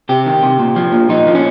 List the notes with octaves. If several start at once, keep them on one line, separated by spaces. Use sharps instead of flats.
C3 G4
D#3
C3
A#2
F3
A#2
A#2 D#4
F3
C#4